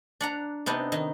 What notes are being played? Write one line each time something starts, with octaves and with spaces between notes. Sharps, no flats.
D4 F#5 A#5
C3 B3 D4 D#4
D#3 D#4